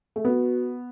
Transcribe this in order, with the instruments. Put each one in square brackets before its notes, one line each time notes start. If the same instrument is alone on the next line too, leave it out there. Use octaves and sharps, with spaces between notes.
[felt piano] A3
[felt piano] B3 [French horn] F#4